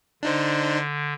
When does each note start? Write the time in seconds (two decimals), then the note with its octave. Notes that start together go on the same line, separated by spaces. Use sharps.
0.23 D3 D4 D#4 C5